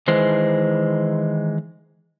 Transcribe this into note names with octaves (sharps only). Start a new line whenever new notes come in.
D#3 E3 G#3 C5